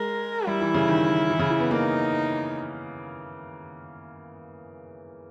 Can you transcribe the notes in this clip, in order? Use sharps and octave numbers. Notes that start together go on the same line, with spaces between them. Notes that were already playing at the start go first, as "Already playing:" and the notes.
Already playing: G#3 A#4
G3 E4
E3
C#3
D#3
D#3
E3
C#3
E3
B3
A#3 D#4